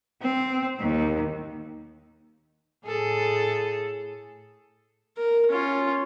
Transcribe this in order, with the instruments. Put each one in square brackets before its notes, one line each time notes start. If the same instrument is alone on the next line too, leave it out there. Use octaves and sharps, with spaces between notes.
[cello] C4
D#2
[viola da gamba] A2 G#4 A4
[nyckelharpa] A#4
C#4 F4